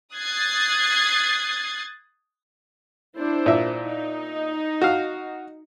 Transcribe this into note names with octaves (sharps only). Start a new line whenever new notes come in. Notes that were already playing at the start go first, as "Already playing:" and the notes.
D#6 F#6 G#6 A6 C7
D4 E4 C5
A#2 E5
D#4
F#4 F5